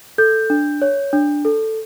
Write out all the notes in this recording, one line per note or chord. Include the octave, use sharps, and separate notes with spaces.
A4 G6
D4
C#5
D4
A4